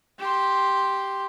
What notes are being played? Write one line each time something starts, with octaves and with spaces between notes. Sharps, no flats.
G4 C6